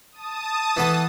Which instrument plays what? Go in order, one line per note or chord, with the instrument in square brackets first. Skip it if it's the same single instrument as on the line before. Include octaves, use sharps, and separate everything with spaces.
[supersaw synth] A5 D#6
[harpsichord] E3 B3 A4